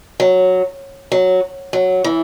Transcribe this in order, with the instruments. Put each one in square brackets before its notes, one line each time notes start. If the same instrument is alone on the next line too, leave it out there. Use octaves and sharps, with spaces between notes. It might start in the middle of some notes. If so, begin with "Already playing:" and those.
[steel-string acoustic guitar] F#3
F#3
F#3
E3